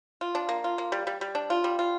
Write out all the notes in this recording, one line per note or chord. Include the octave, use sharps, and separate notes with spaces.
F4
D4
A#3
F4
A#3
G3
G3
G3
D4
F4
G3
F4